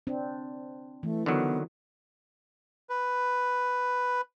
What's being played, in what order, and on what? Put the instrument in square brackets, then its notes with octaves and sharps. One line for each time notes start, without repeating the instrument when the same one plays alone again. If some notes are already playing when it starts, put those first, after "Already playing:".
[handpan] C4 D4
[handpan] E3 [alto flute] A3
[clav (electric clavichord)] D3 D#3 F#3 [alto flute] B3
[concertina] B4